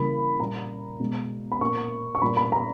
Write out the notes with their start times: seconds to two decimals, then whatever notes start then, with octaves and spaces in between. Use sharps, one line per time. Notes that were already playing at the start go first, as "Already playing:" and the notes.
Already playing: C#3 E3 G3 A#3 B5
0.39 A#2 G3 A#3 A#5
1.00 B2 G#3
1.52 B5
1.61 A#2 A#3 C#6
2.15 C#6
2.22 A#2 G3 A#3 B5
2.37 B5
2.52 A#5